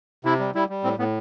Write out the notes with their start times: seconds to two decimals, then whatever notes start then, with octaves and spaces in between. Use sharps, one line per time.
0.25 C3 E4
0.39 G3
0.55 G3 E4
0.69 G3
0.84 A2 C4
0.98 A2 B3